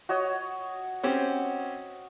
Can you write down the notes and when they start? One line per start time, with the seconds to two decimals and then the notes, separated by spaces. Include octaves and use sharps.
0.09 F#4 C#5 D#5
1.03 C4 C#4 G4